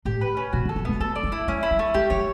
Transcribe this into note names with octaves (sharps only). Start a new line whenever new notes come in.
A2 G4
B4
C#4
B2 F#4
D3
A4
F#3
G3 B3
A3 A4
D5
G3
E4
F#3 C#4
E4
G3
A3
G3 G4
F#3 C#5